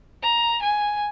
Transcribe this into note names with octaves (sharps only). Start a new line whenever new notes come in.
A#5
G#5